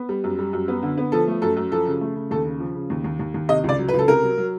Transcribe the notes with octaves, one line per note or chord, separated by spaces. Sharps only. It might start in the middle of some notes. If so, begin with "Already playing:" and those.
Already playing: B3
G3
F#2
G3
F#2
B3
D3
B3
F3 A4
A3
F#2 A4
F#2
F3 A4
C#3
A3
C#3
D#2 A4
C#3
F3
C#3
D#2
D#2
D#2
D#2
C3 D#5
C#2 D5
F#3
B4
C#2 A4
C3 A#4
F#3
F#3